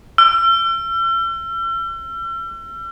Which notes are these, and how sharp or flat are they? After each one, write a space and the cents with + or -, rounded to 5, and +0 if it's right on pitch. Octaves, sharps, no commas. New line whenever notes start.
E6 +45